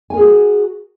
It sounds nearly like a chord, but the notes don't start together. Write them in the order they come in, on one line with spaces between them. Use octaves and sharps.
G#5 A#4 G#4 F#4